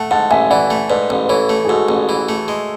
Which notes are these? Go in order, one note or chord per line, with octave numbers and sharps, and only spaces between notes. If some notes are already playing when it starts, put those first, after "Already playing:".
Already playing: A3 F#5 A5
G#2 F#5 A5
A1 E5 G#5
E3 D5 F#5
A3
G#2 B4 D5
A1
B4
E3 A4 C#5
A3
G#4
G#2 F#4 A4
A1
E3
A3
G#3